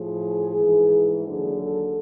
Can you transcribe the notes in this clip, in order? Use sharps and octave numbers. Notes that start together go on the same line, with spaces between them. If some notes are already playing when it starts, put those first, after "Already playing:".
Already playing: A2 F3 G#4
G#2 E3
D#2 D3 F#3 G#4
A4